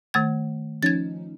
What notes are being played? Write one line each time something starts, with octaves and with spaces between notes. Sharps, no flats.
D#3 A3 G#6
F3 C#4 D#4 G#6 A6